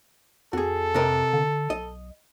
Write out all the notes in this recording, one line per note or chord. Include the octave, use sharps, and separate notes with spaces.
F2 F#4 G#4 A4
C3 A#4 D#5
D3
B1 D#5